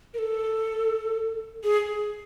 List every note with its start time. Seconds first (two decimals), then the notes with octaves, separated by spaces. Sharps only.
0.14 A#4
0.18 A4
1.64 G#4